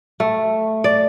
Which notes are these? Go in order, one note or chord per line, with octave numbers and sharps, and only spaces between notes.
A3
D5